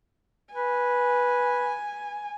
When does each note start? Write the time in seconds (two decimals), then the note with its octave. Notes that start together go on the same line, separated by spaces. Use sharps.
0.53 B4 G#5